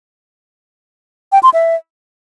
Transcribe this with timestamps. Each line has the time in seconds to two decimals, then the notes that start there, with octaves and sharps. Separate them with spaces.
1.32 G5
1.43 C6
1.54 E5